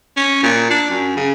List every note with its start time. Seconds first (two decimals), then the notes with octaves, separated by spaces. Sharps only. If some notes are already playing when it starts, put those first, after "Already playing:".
0.16 C#4
0.43 A#2
0.70 D4
0.90 F#2
1.17 C#3